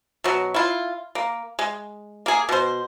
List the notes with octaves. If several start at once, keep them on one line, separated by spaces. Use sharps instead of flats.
B2 F#3
E4 F4
A#3
G#3
A#3 G#4
B2 C5